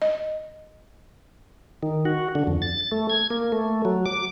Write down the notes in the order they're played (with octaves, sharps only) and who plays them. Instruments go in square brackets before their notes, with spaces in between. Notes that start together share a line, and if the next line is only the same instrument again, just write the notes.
[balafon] D#5
[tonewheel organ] D#3
F#4
D3
F2
A6
A3
G#6
A#3
A3
F#3
D6